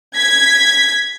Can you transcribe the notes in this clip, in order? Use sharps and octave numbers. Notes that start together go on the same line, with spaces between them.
G#6 B6